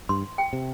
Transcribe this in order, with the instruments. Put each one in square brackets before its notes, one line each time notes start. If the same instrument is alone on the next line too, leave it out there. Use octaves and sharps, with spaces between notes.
[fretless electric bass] G2 [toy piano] C6
[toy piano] G5
[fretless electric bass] C3